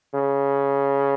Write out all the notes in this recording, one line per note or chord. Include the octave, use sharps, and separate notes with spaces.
C#3